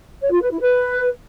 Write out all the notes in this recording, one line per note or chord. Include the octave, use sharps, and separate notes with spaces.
C#5
F4
B4
E4
B4